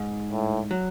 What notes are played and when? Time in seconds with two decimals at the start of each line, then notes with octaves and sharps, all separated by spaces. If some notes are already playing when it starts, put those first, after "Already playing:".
Already playing: G#2
0.32 A2
0.71 F#3